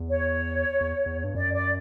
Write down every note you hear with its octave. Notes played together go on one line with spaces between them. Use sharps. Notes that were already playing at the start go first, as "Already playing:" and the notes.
Already playing: E2
C#5
E2
E2
G2
F#2 D5
D5